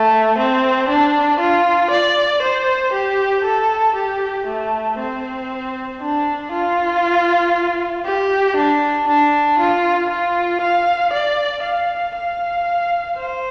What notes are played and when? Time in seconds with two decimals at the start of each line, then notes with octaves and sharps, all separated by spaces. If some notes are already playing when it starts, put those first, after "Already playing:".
Already playing: A3
0.38 C4
0.89 D4
1.39 F4
1.91 D5
2.42 C5
2.93 G4
3.44 A4
3.96 G4
4.47 A3
4.99 C4
6.01 D4
6.52 F4
8.05 G4
8.57 D4
9.07 D4
9.59 F4
10.10 F4
10.61 F5
11.13 D5
11.63 F5
12.15 F5
13.17 C5